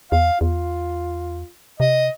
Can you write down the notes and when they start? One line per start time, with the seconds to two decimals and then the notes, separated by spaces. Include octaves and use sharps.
0.12 E2 F5
0.41 E2 F4
1.80 C3 D#5